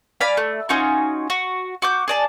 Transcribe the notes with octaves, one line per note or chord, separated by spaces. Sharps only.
D5 F5 G#5 B5
A3
C#4 D#4 F4 F#4
F#4
F#4 D6 G6
G#4 D5 A5